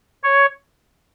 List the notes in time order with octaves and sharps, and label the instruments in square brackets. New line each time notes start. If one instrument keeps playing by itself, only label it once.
[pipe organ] C#5